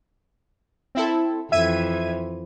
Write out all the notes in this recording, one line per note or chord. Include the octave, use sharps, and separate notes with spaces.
C4 E4 A4
F2 E3 E5 G#6 D#7